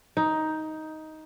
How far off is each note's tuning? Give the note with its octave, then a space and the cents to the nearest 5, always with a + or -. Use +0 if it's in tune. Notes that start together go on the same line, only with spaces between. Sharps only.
D#4 +10